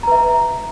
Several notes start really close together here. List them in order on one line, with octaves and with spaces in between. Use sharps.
A#5 B4 E5